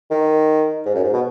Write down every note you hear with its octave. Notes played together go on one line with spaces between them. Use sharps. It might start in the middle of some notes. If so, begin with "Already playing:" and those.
D#3
G#2
F#2
G#2
B2